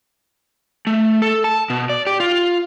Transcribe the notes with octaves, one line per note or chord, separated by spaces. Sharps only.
A3
A4
A5
B2
D5
G4
F4